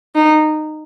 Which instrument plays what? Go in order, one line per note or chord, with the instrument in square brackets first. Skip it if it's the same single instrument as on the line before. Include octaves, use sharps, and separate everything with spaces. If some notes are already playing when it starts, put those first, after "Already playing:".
[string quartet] D#4